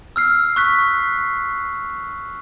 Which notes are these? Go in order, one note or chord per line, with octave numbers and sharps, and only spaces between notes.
E6 F6 C7
C#6 F#6 B6 C7